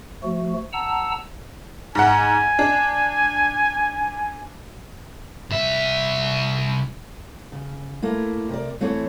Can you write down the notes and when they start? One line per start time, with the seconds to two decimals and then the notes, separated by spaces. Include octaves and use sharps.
0.23 F3 A3 F#4
0.73 F#5 A5 A#5 E6
1.95 G#2 F#5 G#5
2.59 D4
5.51 C2 E5
7.52 C#3
8.02 A3 A#3 E4
8.49 C3 A#4 D5
8.81 E3 A3 C4 E4 C#5